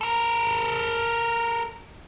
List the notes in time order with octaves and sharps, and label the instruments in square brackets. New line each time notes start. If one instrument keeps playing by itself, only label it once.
[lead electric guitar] A4 A#4